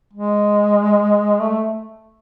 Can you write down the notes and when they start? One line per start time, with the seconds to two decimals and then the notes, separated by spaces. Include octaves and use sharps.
0.13 G#3
1.41 A3